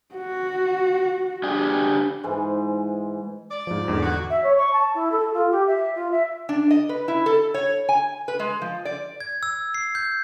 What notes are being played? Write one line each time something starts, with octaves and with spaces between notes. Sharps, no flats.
F#4
D4 G4 G#4
G#2 E3 G#3
D5
G#2 F3
E2 G#2 D3
F#4
E5
C#5
C#6
A5
E4
A4
F4
G4
E5
F4
E5
D4
D#5
B4
E4
A4
C#5
G#5
B4
G#3
F3
D5
G#6
E6
C7
G6